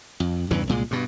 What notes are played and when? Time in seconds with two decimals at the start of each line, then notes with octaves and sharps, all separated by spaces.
0.20 F2
0.51 E2 G2 C#3 E3
0.68 C2 A#2 G#3
0.91 G2 B2